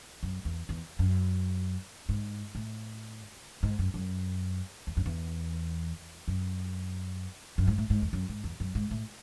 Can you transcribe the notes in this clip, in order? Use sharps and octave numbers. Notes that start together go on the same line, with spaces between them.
F#2
E2
E2
F#2
G#2
A2
G#2
F#2
F#2
E2
F#2
E2
F#2
F#2
G#2
A2
G#2
E2
F#2
G#2
E2
F#2
G#2
A2